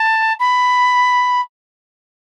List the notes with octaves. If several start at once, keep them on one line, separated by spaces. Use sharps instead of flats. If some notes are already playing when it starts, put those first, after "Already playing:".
Already playing: A5
B5